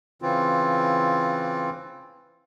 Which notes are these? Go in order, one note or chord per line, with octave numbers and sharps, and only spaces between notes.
C#3 E3 C4 F4